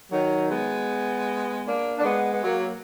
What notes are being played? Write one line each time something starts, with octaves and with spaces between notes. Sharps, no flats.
D#3 F#3
G#3 B3
A#3 D4
D4
G#3 B3
B3
F#3 A#3